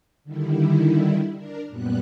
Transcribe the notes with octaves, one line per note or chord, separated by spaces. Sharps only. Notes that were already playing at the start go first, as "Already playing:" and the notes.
D3 D#3 G3 E4
D4 A#4
F#2 A#2 G3 B3 F#6